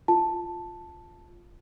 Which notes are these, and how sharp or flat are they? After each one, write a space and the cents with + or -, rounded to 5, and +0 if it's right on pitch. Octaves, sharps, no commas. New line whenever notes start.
F4 +0 A5 +0